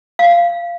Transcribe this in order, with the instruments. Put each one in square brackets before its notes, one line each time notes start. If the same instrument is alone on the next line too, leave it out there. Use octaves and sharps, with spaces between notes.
[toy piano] F5